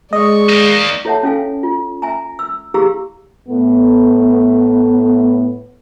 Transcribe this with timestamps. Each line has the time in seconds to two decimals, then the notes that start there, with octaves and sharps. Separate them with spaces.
0.13 G#3 D5 D#5 C#6
0.50 A#3 D#4
1.05 E4 A4 C#5 E5 F#5 A5
1.23 C#4 E4 A4 F5 G#5
1.63 F4
2.02 E5 G#5 A#5
2.39 E6
2.74 E4 G4 G#4 F5 A#5 E6
3.49 A2 A3 B3